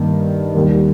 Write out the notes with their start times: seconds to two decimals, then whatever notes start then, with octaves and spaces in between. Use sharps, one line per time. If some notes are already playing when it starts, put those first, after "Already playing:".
Already playing: G2 D#3 A#3 G4
0.55 D#2 D#3 G3